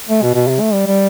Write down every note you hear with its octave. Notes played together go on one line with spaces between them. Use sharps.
A3
B2
B2
C3
A3
G3
G3